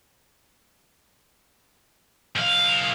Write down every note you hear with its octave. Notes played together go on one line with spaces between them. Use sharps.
B1 F5